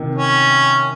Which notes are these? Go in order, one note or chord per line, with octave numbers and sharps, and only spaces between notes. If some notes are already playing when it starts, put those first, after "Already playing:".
Already playing: C3 D#3
C#4